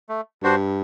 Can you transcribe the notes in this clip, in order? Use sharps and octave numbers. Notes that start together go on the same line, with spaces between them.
A3
G2 D4 F#4 C5